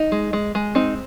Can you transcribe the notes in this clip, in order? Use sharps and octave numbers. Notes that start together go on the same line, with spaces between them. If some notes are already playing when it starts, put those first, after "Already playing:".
Already playing: D#4
G#3
G#3
G#3
C4 D#4